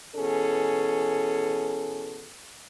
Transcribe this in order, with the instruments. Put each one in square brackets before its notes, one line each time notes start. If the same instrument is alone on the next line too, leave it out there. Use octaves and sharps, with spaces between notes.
[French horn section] B2 E3 C#4 G#4 A4